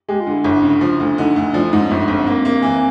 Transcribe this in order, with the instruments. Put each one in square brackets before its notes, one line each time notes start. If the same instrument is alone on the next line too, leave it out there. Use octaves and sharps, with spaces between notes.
[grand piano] G#3 [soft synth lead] G4
[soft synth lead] F4
[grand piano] D3
[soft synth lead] E4
[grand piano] G1
C#3
F3
D2
[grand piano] D3 [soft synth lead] D#4
[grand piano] D2
[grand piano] F3 [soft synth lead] D4
[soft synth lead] E4
[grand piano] G#2 [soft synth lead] D#4
[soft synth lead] C#4
[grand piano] G1 [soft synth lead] B3
[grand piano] G1 [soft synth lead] C4
[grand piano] A#3
A#3
E3